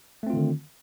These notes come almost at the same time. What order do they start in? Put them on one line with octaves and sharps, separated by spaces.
A3 C4 F4 D#3 D3